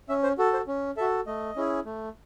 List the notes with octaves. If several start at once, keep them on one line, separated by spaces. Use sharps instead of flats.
C#4 E5
C5
F#4 A4
C5
C#4
F#4 A4 E5
A3 D#5
C#4 E4 G#4
A3